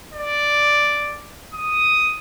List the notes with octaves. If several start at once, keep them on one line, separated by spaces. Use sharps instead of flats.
D5
D#6